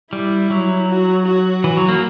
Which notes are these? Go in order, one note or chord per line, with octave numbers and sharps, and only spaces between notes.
G3 E4
F#3
F#4
F#4
E3
F#3
A#3